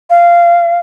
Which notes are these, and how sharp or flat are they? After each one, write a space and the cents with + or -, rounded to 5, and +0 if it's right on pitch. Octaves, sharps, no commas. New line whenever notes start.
F5 -15